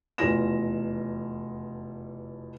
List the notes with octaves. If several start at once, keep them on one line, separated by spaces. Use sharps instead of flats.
F1 E2 B2 F4 A#6 E7